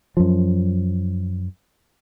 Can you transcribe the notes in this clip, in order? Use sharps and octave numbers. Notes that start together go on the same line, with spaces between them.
F#2 F3